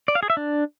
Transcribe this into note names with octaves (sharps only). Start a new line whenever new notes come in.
D5
F5
G#4
E5
D4